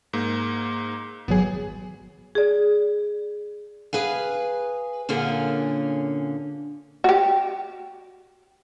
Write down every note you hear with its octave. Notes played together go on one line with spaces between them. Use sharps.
G#2 A#3
G#1 F#3 B3 G#4
G#4 D5
G#4 B4 F5 G#5
A#2 D3 A#3 C#4 G#4
F#4 G4